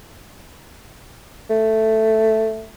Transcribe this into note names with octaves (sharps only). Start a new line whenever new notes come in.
A3